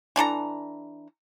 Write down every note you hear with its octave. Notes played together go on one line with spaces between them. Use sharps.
E3 D4 A4 A#5